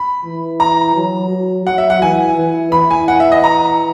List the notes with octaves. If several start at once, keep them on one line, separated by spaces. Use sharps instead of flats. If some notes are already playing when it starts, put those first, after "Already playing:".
Already playing: B5
E3
A#5
F#3
F#3
F#3 F#5
E5
F#5
E3 G#5
E3
E3 B5
G#5
F#5
E5
D#5
A#5